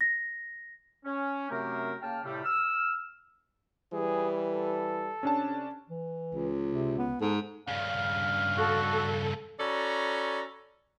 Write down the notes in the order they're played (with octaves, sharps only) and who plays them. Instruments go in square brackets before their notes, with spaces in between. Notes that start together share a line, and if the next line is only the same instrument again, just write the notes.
[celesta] A#6
[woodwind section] C#4
F#2 C3 A3 C4 G4 A#4
C#3 A#3 G5 A5 F6
A2 C3 G3 A3
E6 F6
[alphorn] E3 [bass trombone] G3 [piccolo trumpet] G#4
[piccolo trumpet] A4
[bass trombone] C3 [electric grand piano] C#4 D4 A5
[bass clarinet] E3
[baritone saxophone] C#2
[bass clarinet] C3
B3
[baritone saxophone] G#2 [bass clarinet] A4
[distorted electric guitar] G2 C#3 [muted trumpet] F5
[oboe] F#4 [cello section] A4
[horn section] C#4 F#4 A4 D5 A#5 B5